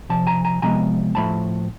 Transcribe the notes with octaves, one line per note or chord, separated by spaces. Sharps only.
C3 F3 A5
G#5 A#5
G#5 A#5
C3 F3 G#3 B3 G#5 A#5
A2 F3 A3 A5 B5